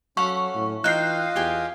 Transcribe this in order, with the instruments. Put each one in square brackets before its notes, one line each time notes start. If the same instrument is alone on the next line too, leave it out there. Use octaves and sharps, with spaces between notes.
[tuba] F#3 [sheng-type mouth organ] C#4 [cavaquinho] A4 F5 F#5 [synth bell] C#6
[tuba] A2
[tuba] E3 [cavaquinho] D#4 G5 [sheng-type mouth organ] F4 D#5 F5 [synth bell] F#6 C7
[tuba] E2 [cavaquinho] G4 G5 G#5